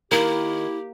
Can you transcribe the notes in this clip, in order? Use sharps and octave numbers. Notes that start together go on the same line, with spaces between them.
D#3 A#3 E4 G4